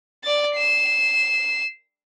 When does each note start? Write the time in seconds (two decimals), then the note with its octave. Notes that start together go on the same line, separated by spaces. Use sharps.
0.24 D5 A6
0.55 C7 E7